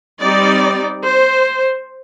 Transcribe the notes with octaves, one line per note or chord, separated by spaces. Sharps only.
G3 C4 D#4 D5
C5